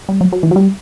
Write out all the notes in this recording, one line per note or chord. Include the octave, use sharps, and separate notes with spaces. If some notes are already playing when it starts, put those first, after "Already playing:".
G3
F#3
F#3
E3
F#3
G3